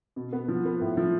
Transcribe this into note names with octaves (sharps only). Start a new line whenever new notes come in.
B2
B3
F3
B3
A2
F3